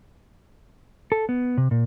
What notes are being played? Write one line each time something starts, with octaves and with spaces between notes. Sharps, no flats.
A4
B3
C3
A#2